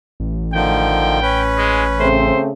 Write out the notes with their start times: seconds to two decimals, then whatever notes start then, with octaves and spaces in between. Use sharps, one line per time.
0.20 A1
0.53 D3 D#3 F3 G5
1.22 C#4 B4
1.58 G#3
2.00 C#3 A3 C4 C5